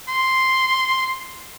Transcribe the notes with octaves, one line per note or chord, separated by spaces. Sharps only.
C6